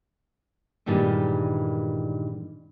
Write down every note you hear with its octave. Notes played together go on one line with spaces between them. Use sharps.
G2 A#2 D#3 E3 G3 G#3